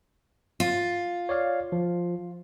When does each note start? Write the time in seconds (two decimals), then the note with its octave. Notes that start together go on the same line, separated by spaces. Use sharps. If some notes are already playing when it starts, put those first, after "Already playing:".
0.60 F4
1.29 C#5 D5 F5
1.72 F3